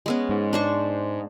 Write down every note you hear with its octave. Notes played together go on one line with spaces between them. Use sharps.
G#3 B3 C#4
G#2
D4 C5 C#6